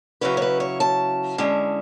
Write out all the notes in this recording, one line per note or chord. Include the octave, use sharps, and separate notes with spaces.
C#3 F#3 C#4 E4 B4
C#5
B4
C#5
A5
D3 G#3 C#4 E4